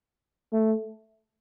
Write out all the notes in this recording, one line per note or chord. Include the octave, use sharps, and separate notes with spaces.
A3